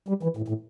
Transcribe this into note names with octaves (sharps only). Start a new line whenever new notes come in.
G3
E3
A2
A2